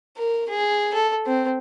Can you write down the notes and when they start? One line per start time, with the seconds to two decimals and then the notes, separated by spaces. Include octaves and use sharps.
0.17 A#4
0.49 G#4
0.94 A4
1.26 C4